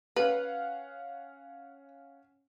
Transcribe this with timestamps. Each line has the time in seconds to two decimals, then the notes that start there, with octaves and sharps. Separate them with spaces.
0.16 C#4 B4 F5 F#5